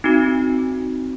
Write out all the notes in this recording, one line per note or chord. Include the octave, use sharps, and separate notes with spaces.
C4 D#4 F#4